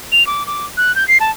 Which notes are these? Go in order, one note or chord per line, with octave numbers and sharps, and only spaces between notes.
F7
D6
D6
F#6
G6
C7
A5